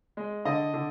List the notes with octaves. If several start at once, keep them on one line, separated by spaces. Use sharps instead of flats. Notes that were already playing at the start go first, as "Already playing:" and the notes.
G#3
D3 D#5
D3